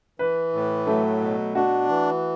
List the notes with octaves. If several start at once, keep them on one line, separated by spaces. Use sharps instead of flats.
E3 B4
A2
F#3 A3
B2
D4 F#4
E3